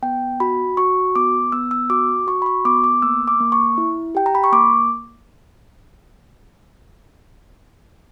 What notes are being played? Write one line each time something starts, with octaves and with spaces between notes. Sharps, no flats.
B3 G5
F#4 B5
F#4 C#6
B3 D6
B3 E6
E6
F#4 D6
F#4 C#6
B5
C#6
B3 D6
D6
A#3 E6
D6
A#3
C#6
E4
G4 G5
A#5
B5
C#6
A#3 D6